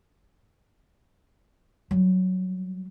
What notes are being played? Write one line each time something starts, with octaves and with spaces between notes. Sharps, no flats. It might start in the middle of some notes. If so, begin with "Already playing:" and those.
F#3 G3